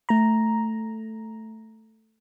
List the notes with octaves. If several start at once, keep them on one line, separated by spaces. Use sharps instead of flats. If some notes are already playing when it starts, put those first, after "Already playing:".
A3 A#5